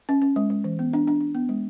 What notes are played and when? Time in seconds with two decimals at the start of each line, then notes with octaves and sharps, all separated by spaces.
0.09 C#4
0.22 C#4
0.36 G#3
0.50 G#3
0.64 E3
0.79 B3
0.93 D4
1.08 D4
1.21 D4
1.35 B3
1.49 G#3